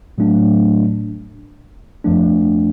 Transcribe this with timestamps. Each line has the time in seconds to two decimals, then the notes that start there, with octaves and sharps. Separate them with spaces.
0.18 A2 F#3 A3 D4
2.04 F2 F3 A3 D4